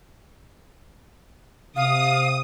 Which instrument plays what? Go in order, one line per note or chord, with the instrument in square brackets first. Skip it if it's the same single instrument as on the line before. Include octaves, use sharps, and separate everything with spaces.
[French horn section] C3 [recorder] F5 [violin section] D#6